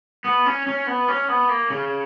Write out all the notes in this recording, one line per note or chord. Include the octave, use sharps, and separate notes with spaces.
B3
C#4
C#4
B3
C#4
B3
A#3
C#3